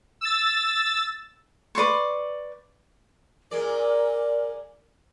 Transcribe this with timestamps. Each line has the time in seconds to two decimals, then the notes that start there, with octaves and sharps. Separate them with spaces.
0.21 E6 A6
1.75 B4 D5 C6 C#6
3.51 A#2 G#3 A#4 D5